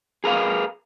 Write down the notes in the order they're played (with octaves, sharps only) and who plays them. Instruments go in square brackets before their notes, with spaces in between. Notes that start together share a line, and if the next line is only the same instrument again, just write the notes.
[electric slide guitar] G#4 A#4 B4 F5